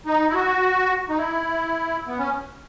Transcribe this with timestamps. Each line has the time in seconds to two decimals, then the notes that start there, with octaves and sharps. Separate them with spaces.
0.06 D#4
0.30 E4
0.34 F#4
1.10 D#4
1.18 E4
2.07 B3
2.18 C#4